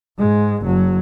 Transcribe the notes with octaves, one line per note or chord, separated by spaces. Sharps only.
G#2 G#3
F#1 F#3